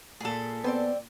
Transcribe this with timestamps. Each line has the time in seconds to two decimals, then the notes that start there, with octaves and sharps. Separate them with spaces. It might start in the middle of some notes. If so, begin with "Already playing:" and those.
0.20 A#2 G#4 A4
0.64 B3 C4 C5 D5